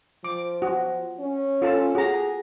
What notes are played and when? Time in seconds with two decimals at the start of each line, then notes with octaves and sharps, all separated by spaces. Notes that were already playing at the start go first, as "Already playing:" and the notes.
0.24 F3 D6
0.62 F#4
1.19 C#4
1.62 F4 A4 A5
1.95 F#4 G#4 A#5